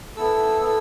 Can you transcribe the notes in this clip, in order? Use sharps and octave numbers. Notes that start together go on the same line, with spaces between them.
B3 E4 A4 E6
B3 E4 A4 E6